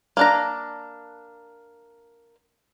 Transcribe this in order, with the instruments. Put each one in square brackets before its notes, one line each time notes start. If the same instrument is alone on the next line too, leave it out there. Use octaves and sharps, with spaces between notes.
[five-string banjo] A#3 D4 A#5